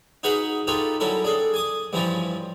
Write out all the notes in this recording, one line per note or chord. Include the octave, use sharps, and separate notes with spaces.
D#4 F#4 G#4 B4 F5 F#5
D#4 F4 G4 A4 B4 C#5
F#3 G3 C#4 E4 A4 A#4
D4 G#4 A4
G#5 D6 D#6
G2 E3 F3 C#4 E4 F4